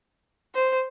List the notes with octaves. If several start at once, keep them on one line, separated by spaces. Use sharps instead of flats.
C5